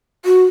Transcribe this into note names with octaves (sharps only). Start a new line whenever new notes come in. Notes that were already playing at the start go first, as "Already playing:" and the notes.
F#4